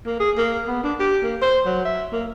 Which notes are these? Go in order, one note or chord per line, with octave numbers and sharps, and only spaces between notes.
A#3
G#4
A#3
B3
D4
G4
A#3
C5
F#3
E5
A#3